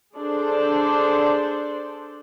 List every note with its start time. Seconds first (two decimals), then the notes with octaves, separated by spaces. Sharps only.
0.16 D4 G#4 A4 C5 D5